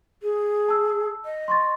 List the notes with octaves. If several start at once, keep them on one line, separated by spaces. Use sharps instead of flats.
G#4
A5 E6
D#5
C6 C#6 A6